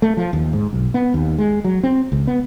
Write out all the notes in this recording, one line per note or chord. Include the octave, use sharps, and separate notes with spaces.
A3
F3
D#2
G#2
B1
B3
D#2
G#3
F#3
C4
C#2
B3